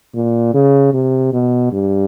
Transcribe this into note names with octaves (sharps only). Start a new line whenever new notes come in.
A#2
C#3
C3
B2
G2